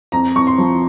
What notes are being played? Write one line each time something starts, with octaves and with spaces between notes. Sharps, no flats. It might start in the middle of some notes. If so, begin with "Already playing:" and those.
F2 A#5
F2 C#6
C6
F3